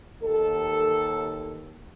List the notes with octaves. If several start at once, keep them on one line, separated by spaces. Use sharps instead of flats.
D#2 A4